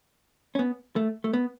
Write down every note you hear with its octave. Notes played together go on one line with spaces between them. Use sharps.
C#4
B3
A3
A3
B3